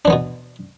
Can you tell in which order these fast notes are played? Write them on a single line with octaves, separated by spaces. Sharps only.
D4 E3 B3 B2